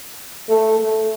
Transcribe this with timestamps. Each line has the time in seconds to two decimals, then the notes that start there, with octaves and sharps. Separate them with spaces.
0.49 A3
0.79 A3